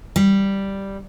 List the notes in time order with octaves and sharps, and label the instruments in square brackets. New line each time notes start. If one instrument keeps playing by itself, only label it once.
[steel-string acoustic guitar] G3